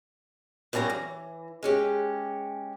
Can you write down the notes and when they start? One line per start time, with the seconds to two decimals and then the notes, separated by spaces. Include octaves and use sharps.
0.73 F#2 G3 C#4 A5 A#5
0.90 E3
1.63 G#3 C#4 G4